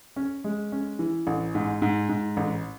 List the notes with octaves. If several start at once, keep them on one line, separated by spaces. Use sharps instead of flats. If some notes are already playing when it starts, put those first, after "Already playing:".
C#4
G#3
C#4
E3
A1
G#2
G#2
G#2
A1